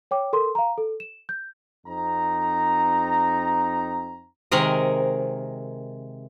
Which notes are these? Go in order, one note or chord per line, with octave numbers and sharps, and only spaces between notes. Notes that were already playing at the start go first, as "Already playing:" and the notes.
C#5 G5 D6
A4 A#4 C6
F5 A#5
A4
E7
G6
F2 C4 D#4 A#5
C3 D#3 G#3 A#4 D#5